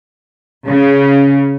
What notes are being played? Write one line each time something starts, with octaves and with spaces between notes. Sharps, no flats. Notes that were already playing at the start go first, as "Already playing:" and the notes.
C#3